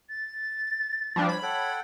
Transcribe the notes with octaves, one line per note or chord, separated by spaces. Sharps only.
A6
F3 G3 D4
C#5 B5
A4 C#5 F#5 G5